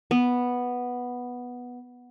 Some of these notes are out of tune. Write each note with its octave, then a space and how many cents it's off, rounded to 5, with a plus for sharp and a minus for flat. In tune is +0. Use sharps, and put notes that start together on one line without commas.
B3 -5